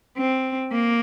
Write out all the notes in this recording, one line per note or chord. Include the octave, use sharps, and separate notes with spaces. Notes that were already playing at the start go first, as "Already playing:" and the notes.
C4
A#3